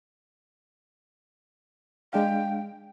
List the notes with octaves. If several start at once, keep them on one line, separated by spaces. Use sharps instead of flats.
G#3 D4 F5 G5